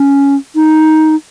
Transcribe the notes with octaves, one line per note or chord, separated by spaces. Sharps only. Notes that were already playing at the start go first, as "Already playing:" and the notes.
Already playing: C#4
D#4